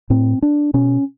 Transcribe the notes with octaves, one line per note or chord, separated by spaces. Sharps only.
A2 C4
D4
B2 C#4